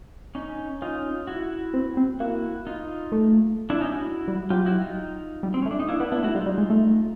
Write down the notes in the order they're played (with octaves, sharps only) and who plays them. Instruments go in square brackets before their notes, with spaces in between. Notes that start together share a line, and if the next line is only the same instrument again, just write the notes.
[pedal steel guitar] C#4 D#4
[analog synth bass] C#4 [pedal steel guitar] D#4 F4
[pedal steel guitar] E4 F#4
[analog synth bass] C4
C4
[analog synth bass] A#3 [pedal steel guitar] E4 F#4
[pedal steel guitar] D#4 F4
[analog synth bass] A3
[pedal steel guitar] D4 E4
C#4 D#4
E4 F#4
[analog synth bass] G3
[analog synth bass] F#3 [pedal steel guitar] F4 G4
[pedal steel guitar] E4 F#4
D#4 F4
[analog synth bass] G3
[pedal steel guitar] C4
C#4
[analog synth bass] A3
[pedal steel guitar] D4
D#4
[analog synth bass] A#3 [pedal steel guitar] D4 E4
[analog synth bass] B3 [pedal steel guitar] D4 E4
[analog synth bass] B3 [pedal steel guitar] D4 E4
[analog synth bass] A3 [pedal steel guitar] E4 F#4
[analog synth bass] G3 [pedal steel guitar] D#4 F4
[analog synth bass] G3
G#3
A3